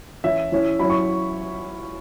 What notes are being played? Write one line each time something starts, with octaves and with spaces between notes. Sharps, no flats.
E3 C#4 E4 E5
E3 C#4 E4
F#3 C#4 E4 B5
C#6